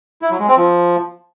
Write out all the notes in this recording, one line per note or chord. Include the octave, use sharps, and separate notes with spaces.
E4
F#3
G#3
C4
F3